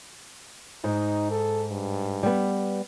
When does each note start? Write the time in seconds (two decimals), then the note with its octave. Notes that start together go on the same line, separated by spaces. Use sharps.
0.84 G#2 D#4
1.31 A4
1.71 G2
2.23 G3 B3